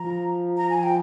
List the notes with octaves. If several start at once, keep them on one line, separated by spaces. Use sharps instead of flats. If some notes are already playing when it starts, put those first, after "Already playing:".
Already playing: F3 A#5
A#5
G#5
G5